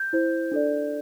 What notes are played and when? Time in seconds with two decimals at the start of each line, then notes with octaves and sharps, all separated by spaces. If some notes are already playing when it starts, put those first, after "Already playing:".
Already playing: G6
0.13 E4 C5
0.52 D4 A4 D5